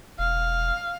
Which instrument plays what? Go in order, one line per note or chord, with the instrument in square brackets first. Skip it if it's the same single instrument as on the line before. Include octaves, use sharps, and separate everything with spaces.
[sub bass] E1 [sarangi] F5